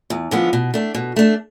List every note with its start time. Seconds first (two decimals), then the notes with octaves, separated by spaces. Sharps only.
0.10 E2
0.31 D3 F3 G#3 B3
0.53 B2
0.74 A3 D4
0.95 B2
1.16 A3 D4